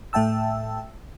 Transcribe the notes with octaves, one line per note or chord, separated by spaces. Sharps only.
A2 A3 E5 G5 A5 E6